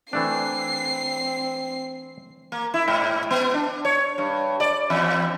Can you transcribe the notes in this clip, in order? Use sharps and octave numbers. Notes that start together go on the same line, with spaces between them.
E3 A3 C4 D4 C7
A#3
E4
G#2
B3
D4
C#5
G2
D5
E2